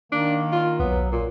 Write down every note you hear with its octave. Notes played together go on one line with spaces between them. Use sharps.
D#3 A#3 D4
F4
B1 F#3 B3
A#2